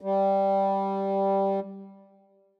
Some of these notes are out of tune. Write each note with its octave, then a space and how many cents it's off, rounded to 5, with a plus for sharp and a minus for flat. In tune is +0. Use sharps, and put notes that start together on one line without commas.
G3 -5